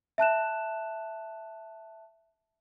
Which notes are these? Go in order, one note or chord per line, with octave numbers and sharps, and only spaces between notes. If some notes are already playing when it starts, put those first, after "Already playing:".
E5 A5 F#6 E7